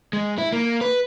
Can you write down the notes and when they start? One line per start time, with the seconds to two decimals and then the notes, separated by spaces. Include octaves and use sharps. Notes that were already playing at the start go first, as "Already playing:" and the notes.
0.13 G#3
0.38 E4
0.53 A#3
0.81 B4